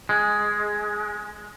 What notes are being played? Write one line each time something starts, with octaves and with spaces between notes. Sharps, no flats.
G#3